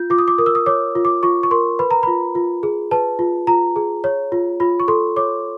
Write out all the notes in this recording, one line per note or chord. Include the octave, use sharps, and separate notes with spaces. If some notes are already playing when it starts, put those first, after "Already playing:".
Already playing: F4 G6
F4 D6
D#6
D6
A#4 D#6
E6
D#6
C#5 D6
F4
D6
F4 C#6
C#6
A#4 C6
B4 B5
A#5
F4 B5
F4
G#4
B4 A5
F4
F4 A#5
G#4
C#5
F4
F4 B5
C#6
A4 C6
C#5 D6